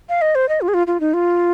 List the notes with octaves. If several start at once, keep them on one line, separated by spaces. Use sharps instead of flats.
F5
D#5
C5
D#5
F4
G#4
F4
F4
D#4
F4